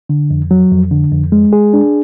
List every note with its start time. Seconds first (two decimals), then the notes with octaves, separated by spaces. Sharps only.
0.09 D3
0.30 F2
0.51 F#3
0.71 F2
0.91 D3
1.12 F2
1.32 G#3
1.53 G#4
1.73 D4